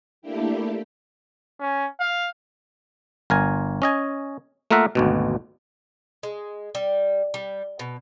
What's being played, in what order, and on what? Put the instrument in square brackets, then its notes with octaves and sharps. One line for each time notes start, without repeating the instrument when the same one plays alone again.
[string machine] A3 A#3 D4 E4 G4
[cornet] C#4
F5
[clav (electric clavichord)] G1 A#4 G#5
C#4 D#5 G#5
A3 A#3 F4 A#4 E5 F#5
G#1 D2 B2
[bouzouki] G#3
G3
G3
B2